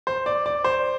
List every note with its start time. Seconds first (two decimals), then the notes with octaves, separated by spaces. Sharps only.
0.07 C5
0.26 D5
0.46 D5
0.64 C5